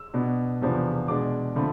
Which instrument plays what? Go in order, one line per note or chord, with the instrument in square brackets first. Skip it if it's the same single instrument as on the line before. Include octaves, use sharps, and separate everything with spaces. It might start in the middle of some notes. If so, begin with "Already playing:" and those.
Already playing: [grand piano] E6
B2 B3 D4
E2 C3 F3 B3 D4
B2 G#3 D4 D6
D3 F3 A3 C4 B5